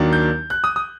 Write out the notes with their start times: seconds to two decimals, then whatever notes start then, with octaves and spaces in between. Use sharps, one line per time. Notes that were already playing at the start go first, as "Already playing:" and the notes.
Already playing: D#2 D#3 F#3 A#3 D4
0.13 G6
0.50 F#6
0.64 D#6
0.76 D#6